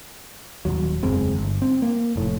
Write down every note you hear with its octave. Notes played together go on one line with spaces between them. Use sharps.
D#1 G#1 D#2 F#3
F#1 E2 G#3 C4
G1
C4
A#3
F1 A2